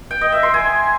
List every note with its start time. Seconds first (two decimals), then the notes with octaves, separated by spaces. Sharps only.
0.11 G5
0.21 D#5
0.32 E5
0.43 C6
0.54 G#5